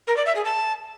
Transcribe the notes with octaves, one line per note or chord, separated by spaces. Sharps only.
A#4
D5
E5
G#4
A5